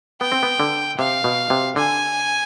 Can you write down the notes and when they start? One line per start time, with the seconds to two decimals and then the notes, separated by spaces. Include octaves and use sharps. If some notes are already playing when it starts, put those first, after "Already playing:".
0.21 B3 G5
0.32 C4
0.43 B3
0.60 D3
0.99 C3 F5
1.24 B2
1.50 C3
1.76 D3 G#5